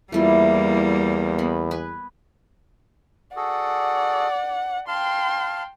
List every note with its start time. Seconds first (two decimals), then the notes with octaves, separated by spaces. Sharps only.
0.12 E2 G3 A3 A#3 E4 F4
1.39 B3 B5
1.71 B4 G#5
3.36 F#4 G#4 A4 D5 F#5
4.88 F5 G5 A5 C6 F6